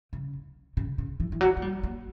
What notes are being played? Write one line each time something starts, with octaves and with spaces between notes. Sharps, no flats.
C#3
C#3
C#3
E3
E3
F#3
A#3
G3
A#3